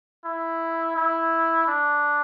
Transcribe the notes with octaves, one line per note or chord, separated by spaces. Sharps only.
E4
E4
D4